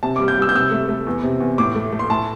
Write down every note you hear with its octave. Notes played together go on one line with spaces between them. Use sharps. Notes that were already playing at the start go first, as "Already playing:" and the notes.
C3 A5
D6
G3
G6
G3 E6
G6
C3 E6
A3
A3
E2
C3
E2
A2 D6
A3
A3
C6
A2 A5